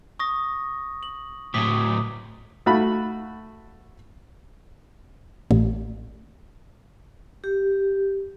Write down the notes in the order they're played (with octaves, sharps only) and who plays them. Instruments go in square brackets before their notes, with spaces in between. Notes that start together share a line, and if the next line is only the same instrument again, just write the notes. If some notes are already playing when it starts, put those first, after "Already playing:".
[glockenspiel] C#6 D#6 A#6
F#7
[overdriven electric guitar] A2 F#3 [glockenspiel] D6 D#6 B6
[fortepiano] A3 F#4 F5 B5
[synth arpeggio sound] A1
[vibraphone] G4